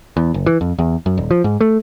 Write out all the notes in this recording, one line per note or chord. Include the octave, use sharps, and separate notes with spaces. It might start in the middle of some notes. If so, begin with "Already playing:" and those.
E2
F#1
E3
F2
E2
F#2
D#1
F3
G#2
A3